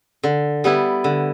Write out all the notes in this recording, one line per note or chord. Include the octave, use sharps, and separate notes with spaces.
D3
G3 B3 E4
D3